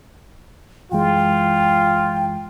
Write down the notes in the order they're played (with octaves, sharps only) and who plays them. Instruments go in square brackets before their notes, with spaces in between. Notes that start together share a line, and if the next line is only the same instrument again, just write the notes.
[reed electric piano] F#2 E3 G#3 [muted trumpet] F4 [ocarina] G5